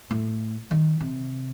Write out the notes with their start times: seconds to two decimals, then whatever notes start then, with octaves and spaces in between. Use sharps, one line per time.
0.11 A2
0.71 D#3
1.00 C3